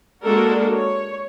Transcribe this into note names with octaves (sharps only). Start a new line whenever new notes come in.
G#3 A#3 D4 F#4 A4 A#4
C#5